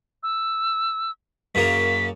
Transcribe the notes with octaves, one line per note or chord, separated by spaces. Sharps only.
E6
F#2 C#3 A#3 B6